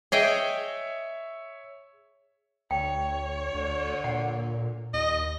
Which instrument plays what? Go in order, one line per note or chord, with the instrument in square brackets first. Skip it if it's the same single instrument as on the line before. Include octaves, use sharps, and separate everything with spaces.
[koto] G#4 D#5 G5 [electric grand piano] C#5 E5
[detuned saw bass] D2 [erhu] C#5 [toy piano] G5
[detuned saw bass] D2 [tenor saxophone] D3
[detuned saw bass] A#2 [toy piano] F#5
[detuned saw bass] D#2 [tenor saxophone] D#5